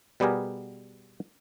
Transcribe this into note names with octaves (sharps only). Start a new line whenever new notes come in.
B2 G3 B3 G4 G#4 A#4